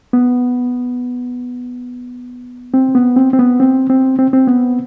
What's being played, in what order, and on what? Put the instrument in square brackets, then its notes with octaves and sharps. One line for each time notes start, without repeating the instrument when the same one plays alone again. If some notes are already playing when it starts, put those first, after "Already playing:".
[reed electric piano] B3
C4
B3
C4
C4
B3
C4
C4
C4
C4
B3